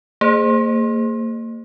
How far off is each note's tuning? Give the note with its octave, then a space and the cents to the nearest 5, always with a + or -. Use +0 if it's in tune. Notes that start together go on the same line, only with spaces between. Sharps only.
A#3 -35 G#4 +0 C5 +0